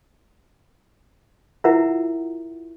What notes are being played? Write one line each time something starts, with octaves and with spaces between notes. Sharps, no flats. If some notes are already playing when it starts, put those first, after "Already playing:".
E4 F4 A#4 E5 F#5 A#5